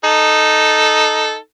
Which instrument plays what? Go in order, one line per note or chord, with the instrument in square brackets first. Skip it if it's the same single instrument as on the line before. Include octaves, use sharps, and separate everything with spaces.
[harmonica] D#4 A4